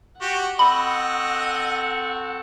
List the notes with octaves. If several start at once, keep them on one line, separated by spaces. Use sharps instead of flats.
F#4 G4 F#5
C4 F#4 A4 D#5 B5